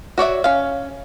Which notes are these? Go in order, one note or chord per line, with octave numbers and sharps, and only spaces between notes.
F#4 C#5 D5 E5
C#4 F5